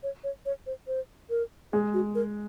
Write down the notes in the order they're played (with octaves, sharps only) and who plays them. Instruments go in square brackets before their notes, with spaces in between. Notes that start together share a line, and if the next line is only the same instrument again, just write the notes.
[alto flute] C#5
C#5
C#5
C5
C5
A#4
[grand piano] G#3 [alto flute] G#4
[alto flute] F#4
A#4